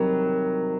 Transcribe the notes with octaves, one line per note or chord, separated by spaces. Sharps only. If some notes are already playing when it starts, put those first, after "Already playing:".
Already playing: C3 D#3 F#3 G3